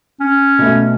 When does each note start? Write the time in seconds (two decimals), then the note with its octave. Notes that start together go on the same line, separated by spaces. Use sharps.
0.20 C#4
0.59 B2 A3